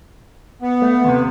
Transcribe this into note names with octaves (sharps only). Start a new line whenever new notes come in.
B3
A3
D#2 C3